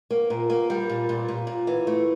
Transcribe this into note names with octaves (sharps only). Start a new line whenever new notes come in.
A#3
A#2
A#3
G3
A#2
A#2
A#2
A#2
E3
A3